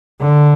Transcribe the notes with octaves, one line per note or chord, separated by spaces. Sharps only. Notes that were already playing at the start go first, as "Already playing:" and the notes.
D3